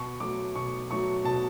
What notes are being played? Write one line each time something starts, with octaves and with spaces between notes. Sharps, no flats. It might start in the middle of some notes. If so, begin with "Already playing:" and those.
Already playing: B2 C#6
F#3 A3 D6
B2 C#6
F#3 A3 C#6
B2 A5